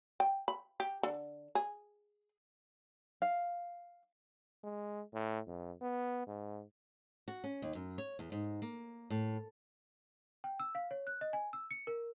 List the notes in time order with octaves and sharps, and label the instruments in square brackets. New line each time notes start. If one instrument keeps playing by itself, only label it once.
[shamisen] G5
B5
G4
D3
G#4
[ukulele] F5
[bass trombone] G#3
A2
F2
B3
G#2
[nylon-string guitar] F#4
C#4
D#2
F#2
C#5
E2
G#2
A#3
A2
[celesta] G5
E6
F5
C#5
F#6
D#5
G#5
E6
C#7
A#4